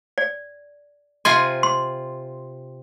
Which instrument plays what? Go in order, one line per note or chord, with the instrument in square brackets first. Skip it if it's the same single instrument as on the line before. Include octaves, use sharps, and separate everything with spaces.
[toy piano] D5
[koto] C3 F4 G#5 [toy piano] C6
[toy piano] C6